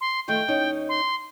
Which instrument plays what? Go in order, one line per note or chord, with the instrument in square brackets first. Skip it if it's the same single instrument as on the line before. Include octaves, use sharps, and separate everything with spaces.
[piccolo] C6
[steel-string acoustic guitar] D#3 F3 A3 [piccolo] G5
[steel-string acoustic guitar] D#2 C#4 D#4
[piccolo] C6